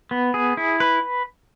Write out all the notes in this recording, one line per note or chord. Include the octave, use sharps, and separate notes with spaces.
B3
G#4
E4
B4